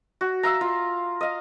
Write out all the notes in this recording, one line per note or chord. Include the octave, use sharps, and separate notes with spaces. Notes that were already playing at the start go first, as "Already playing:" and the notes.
F#4
E5 F5 A#5
F4
D#5 F5